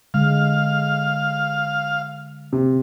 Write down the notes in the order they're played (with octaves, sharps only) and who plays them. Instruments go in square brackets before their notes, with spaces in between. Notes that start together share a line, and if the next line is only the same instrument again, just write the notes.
[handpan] D3 G#3 [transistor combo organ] F5
[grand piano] C3